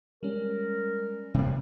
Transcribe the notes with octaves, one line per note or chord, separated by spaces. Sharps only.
G3 G#3 C#4 A#4
C3 G3 A#3